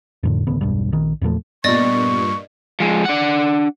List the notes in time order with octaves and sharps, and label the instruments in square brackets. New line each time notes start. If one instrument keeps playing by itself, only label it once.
[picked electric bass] F2 A2 D3
A1 D2 C#3 B3
E1 B1 G2
A#1 D#3
E2 A#2 F3 A3
[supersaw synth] G2 A#2 [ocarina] B3 [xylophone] D5 D#5 A6 [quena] C#6
[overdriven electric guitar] F3 G#3
D4 F#5